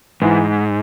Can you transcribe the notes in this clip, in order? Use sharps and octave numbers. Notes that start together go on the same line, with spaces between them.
G#2 E3